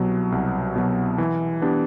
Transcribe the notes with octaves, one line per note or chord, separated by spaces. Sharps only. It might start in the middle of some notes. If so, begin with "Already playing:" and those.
Already playing: C2 B2 F#3
C2
B2 F#3
E3
B3 D4 G4